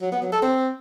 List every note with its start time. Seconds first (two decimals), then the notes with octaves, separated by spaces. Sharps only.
0.02 F#3
0.12 B3
0.22 F#3
0.32 A4
0.42 C4